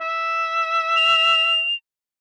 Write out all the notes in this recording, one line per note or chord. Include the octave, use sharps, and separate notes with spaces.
E5
F7